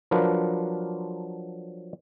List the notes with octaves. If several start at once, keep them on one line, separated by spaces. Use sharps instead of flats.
F3 F#3 D4 F4 A#4 B4